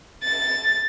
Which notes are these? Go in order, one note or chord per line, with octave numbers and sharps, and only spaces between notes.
A6